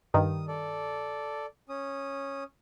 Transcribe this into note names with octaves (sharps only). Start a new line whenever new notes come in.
G2 D#3 D#6
A4 D5
C#4 D#6